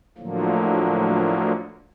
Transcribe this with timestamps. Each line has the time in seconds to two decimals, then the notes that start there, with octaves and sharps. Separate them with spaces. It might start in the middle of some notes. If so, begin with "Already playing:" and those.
0.18 A2 D3 F3 F#3 A#3